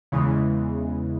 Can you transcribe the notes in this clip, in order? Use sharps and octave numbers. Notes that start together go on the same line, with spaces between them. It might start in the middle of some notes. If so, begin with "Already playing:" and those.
E2 C#3 E3 G#3